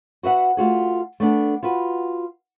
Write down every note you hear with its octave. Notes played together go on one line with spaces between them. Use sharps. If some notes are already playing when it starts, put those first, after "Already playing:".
F#4 B4 E5 F#5
A3 F4 F#4 G#4
A3 B3 D4 A4
F4 F#4 B4